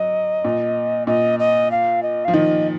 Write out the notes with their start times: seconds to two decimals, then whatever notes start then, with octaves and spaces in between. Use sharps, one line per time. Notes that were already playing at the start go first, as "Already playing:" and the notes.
Already playing: F#3 D#5
0.45 A#2
1.07 A#2 D#5
1.39 D#5
1.71 F5
2.03 D#5
2.25 F3 F5
2.34 D#3 D#5